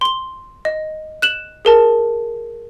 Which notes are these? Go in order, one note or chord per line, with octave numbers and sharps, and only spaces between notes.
C6 G7
D#5
F#6 E7 F#7
G#4 A#4 A5